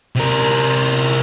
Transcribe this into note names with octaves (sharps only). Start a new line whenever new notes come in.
C3 A#4